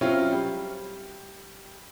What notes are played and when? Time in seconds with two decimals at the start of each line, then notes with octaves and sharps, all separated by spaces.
0.01 F#3 C4 C#4 E4 F4
0.32 G3